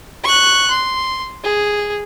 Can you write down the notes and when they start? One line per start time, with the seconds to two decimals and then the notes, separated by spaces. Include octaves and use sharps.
0.24 C#6 F#6
0.71 C6
1.44 G#4